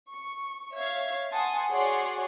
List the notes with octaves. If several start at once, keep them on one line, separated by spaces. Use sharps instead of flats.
C#6
C#5 E5 F5 G#6
F#5 G#5 A5 C6 D#6
F#4 G#4 C#5 D5 F#5 C6